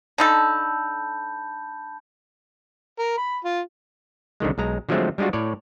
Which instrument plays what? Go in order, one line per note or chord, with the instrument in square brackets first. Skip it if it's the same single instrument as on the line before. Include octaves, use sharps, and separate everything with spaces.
[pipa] D3 D#4 A4 [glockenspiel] A5 B5 G6
[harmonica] A#4
B5
F4
[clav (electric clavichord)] C2 D3 D#3 G#3
B1 G#3 A#5
D3 F3 F#3 G#3 A3 C4
G3 G#3 D4 F4 F#4
A2 C#5 D5